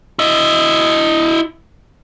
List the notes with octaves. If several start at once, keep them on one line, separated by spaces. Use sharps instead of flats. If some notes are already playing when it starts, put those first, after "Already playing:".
E4 D#5